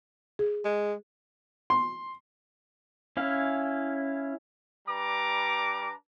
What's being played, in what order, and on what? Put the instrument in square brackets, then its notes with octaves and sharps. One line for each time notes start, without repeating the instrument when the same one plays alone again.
[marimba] G#4
[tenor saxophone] G#3
[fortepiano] C6
[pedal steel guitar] C#4 E4 F5
[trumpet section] G3 D4 B4 A#5 D6